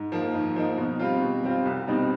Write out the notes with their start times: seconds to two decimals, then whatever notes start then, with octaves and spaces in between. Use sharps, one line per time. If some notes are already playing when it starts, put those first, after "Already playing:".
Already playing: G#2
0.12 F3 A#3 D#4
0.34 G#2
0.56 F3 A#3 D#4
0.77 B2
0.99 G3 C4 F4
1.22 B2
1.44 G3 C4 F4
1.65 C2
1.87 B2 G3 C4 D#4